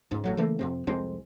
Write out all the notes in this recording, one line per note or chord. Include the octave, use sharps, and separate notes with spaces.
C#2 G#2
G1 A2 F#3
C#3 E3 A3 A#3
F2 C3 C4
C2 F2 G#3 C4